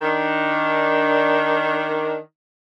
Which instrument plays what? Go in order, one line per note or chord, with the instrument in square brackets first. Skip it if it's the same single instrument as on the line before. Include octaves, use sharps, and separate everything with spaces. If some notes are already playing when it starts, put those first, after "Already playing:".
[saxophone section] D#3 D4